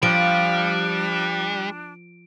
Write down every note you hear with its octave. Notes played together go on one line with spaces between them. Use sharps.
F3 G3 D4 D7